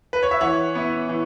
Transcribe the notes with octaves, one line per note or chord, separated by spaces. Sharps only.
B4
C#5
E5
E3 C#5 F#5
B3 E4
E3